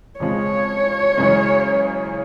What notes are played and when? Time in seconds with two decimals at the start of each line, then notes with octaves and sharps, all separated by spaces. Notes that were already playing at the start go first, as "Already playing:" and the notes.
0.20 F2 C#3 F3 G#3 C#5
1.17 F#2 C#3 E3 G#3